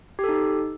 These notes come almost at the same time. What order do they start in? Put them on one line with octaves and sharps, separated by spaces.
G4 A4 D#4